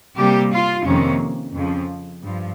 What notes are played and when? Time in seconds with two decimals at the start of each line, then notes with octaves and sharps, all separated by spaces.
0.16 C3 G3 A#3 G4
0.51 F4
0.85 F2 C3 D#3 A#3 C#4
1.54 F2 C#3 F3
2.23 G2 F3